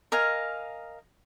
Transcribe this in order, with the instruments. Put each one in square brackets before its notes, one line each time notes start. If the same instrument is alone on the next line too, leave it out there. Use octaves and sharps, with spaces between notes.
[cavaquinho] A#4 D#5 F5 G#5